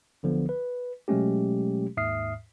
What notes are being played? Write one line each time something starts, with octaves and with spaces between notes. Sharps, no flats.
B1 D3 F3 B3
B4
B2 F#3 G#3 A3 C#4 G4
D#2 G#2 E5 D#6 F6 C7